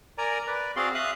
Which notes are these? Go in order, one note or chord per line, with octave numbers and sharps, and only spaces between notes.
A#4 D5 G#5 A#5
B4 D5
C4 F#4 G#4 D5 F5 C6
E5 F5 D#6 F#6